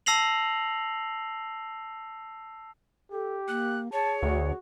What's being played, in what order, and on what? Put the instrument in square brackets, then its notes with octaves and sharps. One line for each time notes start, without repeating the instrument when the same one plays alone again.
[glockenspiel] A5 E6 A#6 C7 F7 F#7
[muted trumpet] G4 [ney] A4
[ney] A#3 [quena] F#6
[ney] G#4 [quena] C#5 [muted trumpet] A5
[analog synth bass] D2 [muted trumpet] F#4